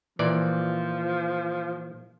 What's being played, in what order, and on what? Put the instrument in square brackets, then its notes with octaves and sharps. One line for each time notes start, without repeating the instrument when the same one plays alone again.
[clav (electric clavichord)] A#2 E3 D5 [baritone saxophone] F3